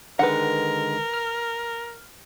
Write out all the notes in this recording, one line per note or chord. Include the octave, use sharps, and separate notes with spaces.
D3 D#3 G#3 A#4 B4 F#5
F6